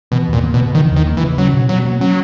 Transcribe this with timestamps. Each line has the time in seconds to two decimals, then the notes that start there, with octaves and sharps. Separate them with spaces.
0.12 B2 E3
0.28 D#2 A#2
0.44 A#3
0.54 B2
0.60 C#3
0.75 D#3 E3
0.91 D#2
0.96 D#3
1.06 A#3
1.17 E3
1.23 C#3
1.38 F#3 C#4
1.54 B2
1.69 B2 F#3
1.85 A#3
2.01 F#3 C#4